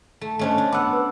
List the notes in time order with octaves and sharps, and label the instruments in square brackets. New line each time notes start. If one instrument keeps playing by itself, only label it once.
[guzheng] A3
[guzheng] A3 C#4 D4 [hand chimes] C5 D#5 A5
[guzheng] D4
[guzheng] B3 F#5 [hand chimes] D6 E6
[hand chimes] B4